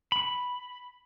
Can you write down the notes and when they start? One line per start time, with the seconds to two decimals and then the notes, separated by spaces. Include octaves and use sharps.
0.12 B5